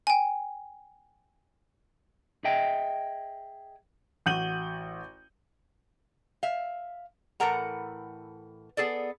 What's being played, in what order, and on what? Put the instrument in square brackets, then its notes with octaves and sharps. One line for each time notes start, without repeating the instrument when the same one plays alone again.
[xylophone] G5 G#5
[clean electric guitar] G#4 D#5 E5 G5
[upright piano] A1 F#4 G6 D#7 F#7 G7
[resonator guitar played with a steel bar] E5 F5
A2 E3 A4 A#4 F#5 A#5
B3 G#4 A4 D5